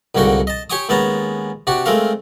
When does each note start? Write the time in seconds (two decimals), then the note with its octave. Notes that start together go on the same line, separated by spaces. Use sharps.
0.15 C2 G#2 D3 A#3 F#4 G5
0.47 D#5 A5
0.70 G4 C#5 G5 G#5 D6 D#6
0.89 D#2 G#3 B3 C#4 A5 A#5
1.67 C3 D4 F#4 G4
1.86 G#3 A3 C4 A#4 F5